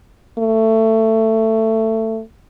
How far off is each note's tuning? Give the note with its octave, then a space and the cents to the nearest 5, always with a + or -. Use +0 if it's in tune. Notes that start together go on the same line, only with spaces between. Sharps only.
A3 +15